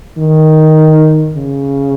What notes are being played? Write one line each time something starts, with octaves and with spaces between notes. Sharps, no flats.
D#3
C#3